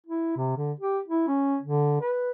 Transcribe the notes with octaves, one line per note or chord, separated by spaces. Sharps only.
E4
C3
D3
G4
E4
C#4
D3
B4